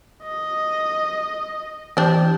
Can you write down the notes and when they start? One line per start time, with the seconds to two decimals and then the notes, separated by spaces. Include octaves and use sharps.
0.24 D#5
1.97 E3 C4 D4 G4 G6